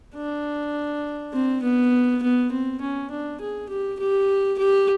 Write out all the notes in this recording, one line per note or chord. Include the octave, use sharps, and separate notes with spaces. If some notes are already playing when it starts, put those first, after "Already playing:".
D4
C4
B3
B3
C4
C#4
D4
G#4
G4
G4
G4